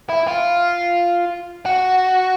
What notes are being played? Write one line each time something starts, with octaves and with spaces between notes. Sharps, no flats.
E4
F4
F#4